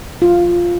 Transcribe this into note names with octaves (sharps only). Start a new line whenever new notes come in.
F4